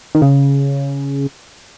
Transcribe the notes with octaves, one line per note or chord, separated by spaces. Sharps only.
D#3
C#3